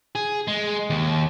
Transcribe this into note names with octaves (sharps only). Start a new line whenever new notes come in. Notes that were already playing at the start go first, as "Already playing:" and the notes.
G#4
G#3
D#2